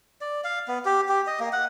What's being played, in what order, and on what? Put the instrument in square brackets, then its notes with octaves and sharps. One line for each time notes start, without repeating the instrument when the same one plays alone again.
[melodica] D5
F5
B3
G4
G4
D#5
A#3
F#5